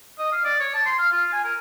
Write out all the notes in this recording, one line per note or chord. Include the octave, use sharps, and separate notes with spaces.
D#5
F5
D5
C#5
A5
C6
F5
F4
G#5
A#4